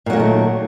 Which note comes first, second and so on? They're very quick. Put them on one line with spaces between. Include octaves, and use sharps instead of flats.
A#2 F#3 A#3 D#3 A3